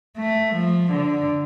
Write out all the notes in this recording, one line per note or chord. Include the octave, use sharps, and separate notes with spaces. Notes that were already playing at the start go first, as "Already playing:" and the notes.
A3
F3
D3